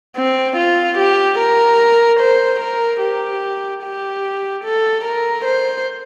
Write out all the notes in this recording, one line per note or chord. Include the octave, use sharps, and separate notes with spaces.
C4
F4
G4
A#4
C5
A#4
G4
G4
A4
A#4
C5